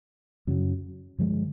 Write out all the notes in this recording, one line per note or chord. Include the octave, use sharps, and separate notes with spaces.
F#2 C#3 F#3
G2 D3 F3 G#3